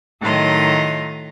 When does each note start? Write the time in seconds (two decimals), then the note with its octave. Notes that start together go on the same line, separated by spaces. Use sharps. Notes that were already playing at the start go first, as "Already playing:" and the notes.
0.20 A2 D#3 F#3 F4 D#5